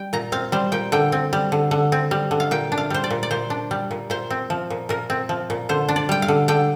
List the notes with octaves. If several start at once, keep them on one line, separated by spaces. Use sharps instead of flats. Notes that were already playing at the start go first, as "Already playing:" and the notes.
Already playing: G3 G5
A#2 A#5
C4 F5
G3 C5
A#2 G5
D3 G5
C4
G3
D3
D3
C4
G3
D3
F5
A#2 G5
D4
F5
G3 C5
D5
A#2
D5
A#2 C5
D4
G3
A#2
A#2 C5
C4
F3
A#2
A#2 A#4
C4
F3
A#2
D3 C5
D4
D5
G3 G5
F5
D3
D3 G5